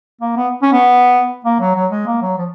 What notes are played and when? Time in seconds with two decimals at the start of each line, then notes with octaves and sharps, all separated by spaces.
0.21 A#3
0.37 B3
0.62 C#4
0.73 B3
1.45 A#3
1.60 F#3
1.75 F#3
1.91 G#3
2.07 A#3
2.22 F#3
2.38 F3